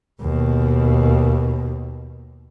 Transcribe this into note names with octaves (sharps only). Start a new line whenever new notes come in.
D#2 B2